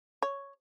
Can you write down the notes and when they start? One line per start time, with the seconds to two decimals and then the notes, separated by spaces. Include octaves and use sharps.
0.22 C#5